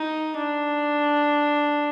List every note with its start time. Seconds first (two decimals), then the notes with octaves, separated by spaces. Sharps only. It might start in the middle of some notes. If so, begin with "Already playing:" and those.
Already playing: D#4
0.37 D4